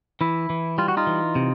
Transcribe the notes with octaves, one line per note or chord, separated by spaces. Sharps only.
E3 E4
E3
G3 F4
F#4
D#4 F4
E3
C3